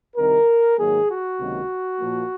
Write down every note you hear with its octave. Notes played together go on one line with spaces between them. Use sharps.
C2 C3 D#3 A#4
G#2 D#3 F#3 A#3 G#4
F#4
C#2 C3 D#3 F#3 A#3
A#2 F3 A#3